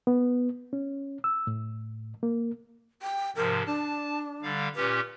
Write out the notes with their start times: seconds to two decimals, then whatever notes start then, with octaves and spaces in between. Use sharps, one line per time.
0.07 B3
0.73 C#4
1.24 E6
1.47 A2
2.23 A#3
3.02 G5
3.36 G#2 C3 F3 A#4
3.66 D4 A5
4.43 D3 G3 F5
4.76 A#2 C#4 G4 B4